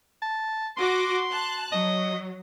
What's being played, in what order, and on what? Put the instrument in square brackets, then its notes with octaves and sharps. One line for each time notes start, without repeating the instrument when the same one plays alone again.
[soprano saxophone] A5
[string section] F#4 D6 A#6 [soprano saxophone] C6
[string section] A5 F#6
[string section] F#3 [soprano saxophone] D#5